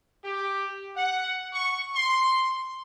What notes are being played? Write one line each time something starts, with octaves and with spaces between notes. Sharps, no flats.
G4
F#5
C#6
C6